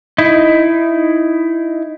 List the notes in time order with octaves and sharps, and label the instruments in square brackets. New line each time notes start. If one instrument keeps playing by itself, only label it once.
[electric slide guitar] D#4 E4